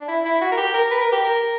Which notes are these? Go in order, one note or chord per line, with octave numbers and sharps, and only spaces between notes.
D4
E4
E4
F#4
A#4
G4
A#4
B4
A#4
G4
A#4